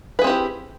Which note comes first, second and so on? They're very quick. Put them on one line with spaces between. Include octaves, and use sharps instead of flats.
B4 G#4 C4 G4 E4